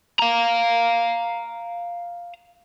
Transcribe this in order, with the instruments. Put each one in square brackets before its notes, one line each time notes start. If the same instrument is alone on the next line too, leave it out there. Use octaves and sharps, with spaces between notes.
[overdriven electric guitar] F5 A#5